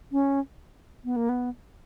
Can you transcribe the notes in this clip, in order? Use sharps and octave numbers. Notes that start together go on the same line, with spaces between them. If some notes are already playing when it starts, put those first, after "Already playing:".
C#4
B3
A#3
B3